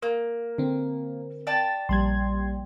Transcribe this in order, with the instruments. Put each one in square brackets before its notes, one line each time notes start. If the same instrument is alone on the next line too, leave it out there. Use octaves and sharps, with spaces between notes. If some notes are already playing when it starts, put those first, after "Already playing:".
[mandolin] A#3 [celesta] A#4
[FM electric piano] D3 C4
[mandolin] D5 G5 A5
[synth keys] A#1 G3 [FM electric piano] C6 G#6